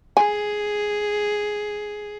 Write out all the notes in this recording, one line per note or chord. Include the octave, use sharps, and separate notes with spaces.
G#4 G#5